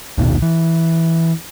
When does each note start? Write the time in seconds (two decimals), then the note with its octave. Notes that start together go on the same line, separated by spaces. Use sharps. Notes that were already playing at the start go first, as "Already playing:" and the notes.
0.18 A#1 D#2 B2 D#3
0.42 E3